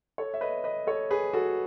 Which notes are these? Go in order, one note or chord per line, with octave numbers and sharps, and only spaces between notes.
A4 C#5
E5
B4 D#5
B4 D#5
A4 C#5
G#4 B4
F#4 A4